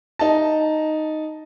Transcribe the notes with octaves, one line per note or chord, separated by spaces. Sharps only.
D#4 A5